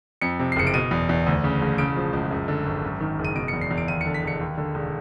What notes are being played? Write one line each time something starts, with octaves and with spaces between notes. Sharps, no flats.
F2 C#7
C3
C7
F#1 C#7
D7
B2 D#7
E2
E2
D2
C#3
E1
C#3 D7
F3
C#2
F#2
D3
G#1
F#2
D#3
F#1
D#7
B2 D7
C#7
E2
C7
E2
D7
D#2 D#7
C#7
D3
B6
E1 C#7
D#2
D3
E1